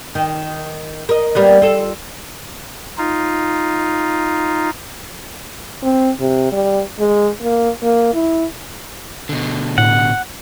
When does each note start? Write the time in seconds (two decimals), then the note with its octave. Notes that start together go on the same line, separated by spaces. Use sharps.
0.15 D#3
1.09 A#4 D#5
1.35 G3 A#3 B3
1.62 F4 A4
2.98 D#4 F4
5.82 C4
6.20 C3
6.52 G3
6.99 G#3
7.42 A#3
7.83 A#3
8.14 E4
9.29 B2 D3
9.78 A2 F#5